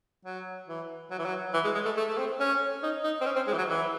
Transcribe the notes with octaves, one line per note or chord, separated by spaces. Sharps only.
F#3
E3
F#3
E3
F#3
E3
G#3
G#3
A3
A3
A3
C4
C#4
D#4
D#4
C4
C#4
C4
G#3
E3
F#3
E3